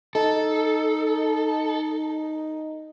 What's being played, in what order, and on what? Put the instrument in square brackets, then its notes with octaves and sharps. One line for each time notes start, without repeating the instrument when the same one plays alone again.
[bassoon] D#4 [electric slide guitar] A4